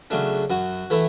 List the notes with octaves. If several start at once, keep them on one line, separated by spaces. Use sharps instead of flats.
C#3 F#3 A3 D4
F#2 F#4
E3 A3 E4